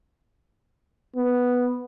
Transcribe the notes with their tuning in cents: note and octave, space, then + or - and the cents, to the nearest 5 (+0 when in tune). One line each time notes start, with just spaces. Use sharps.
B3 +0